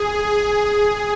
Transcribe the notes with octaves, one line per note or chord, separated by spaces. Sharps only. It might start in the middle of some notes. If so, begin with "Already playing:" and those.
Already playing: G#4